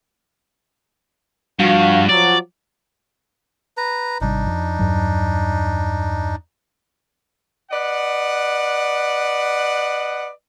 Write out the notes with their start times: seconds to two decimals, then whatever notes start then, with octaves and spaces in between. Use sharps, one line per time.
1.60 G2 F3 F#4 F5
2.09 F3 F#3 D5
3.77 B4 A#5
4.21 G#1 C3 G3 D4 D#4
4.46 F2
4.79 E2 G2 F#3
7.71 B4 D5 D#5 F#5